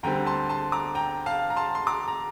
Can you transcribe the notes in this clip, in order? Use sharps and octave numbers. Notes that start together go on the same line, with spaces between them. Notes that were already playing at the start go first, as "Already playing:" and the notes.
D2 D3 G3 C4 G5 A#5
A5 C6
A5 C6
A#5 D6
G5 A#5
F5 A5
A#5
A5 C6
C6
A#5 D6
A#5